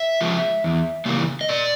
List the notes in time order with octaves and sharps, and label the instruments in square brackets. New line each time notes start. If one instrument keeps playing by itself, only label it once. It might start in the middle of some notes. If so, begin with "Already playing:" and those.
Already playing: [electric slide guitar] E5
F3 G#3
E2
C#3 E3 G3 A#3
D#5
A#2 D5